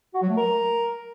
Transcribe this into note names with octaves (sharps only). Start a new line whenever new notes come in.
F#4
F#3
A3
A#4